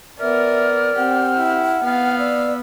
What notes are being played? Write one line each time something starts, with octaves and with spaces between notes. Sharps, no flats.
B3 A#4 D5 E5 F6
C4 G4 F#5
E4
B3 F5
D5 E6